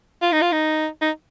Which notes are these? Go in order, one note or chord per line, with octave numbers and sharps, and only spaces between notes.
F4
D#4
F4
D#4
D#4